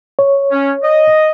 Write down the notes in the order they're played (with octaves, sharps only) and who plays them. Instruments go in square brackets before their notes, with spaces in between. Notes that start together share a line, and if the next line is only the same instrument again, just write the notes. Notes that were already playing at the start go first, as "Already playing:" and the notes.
[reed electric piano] C#5
[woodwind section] C#4
D#5